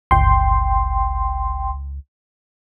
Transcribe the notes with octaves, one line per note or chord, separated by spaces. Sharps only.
G1 C#2 G5 C6